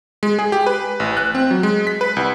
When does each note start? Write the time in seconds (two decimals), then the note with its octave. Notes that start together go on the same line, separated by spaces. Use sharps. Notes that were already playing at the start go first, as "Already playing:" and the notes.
0.23 G#3
0.39 G#4
0.52 G4
0.66 B4
1.00 A1
1.17 F#6
1.35 C4
1.51 F#3
1.63 G#3
1.87 B6
2.01 B4
2.16 C2